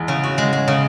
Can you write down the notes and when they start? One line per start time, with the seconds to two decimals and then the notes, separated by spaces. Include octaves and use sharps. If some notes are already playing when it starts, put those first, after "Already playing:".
Already playing: E2 G#3
0.08 C#3
0.23 F#4
0.38 G#3
0.53 G#3
0.68 C#3